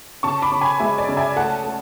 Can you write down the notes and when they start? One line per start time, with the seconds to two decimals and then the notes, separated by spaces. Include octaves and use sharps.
0.23 C#3 A5 C#6
0.42 B5 D6
0.52 C#3
0.61 G#5 B5
0.80 G#3 E5
0.98 D5
1.09 C#3
1.17 E5 G#5
1.36 A3 F#5 A5
1.64 A3